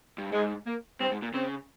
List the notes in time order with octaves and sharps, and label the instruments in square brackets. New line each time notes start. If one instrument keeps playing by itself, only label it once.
[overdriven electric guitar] G2
[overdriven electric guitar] G#2 [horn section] G#3
[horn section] A#3
[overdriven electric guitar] G2 [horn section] C4
[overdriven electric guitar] G#2
A#2
[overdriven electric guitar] C#3 [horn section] C4